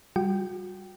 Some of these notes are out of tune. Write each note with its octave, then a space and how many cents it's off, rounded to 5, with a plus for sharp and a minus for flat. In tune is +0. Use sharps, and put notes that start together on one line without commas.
G3 +0 F#4 -30 G5 -15